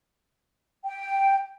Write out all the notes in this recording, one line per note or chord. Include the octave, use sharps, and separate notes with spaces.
G5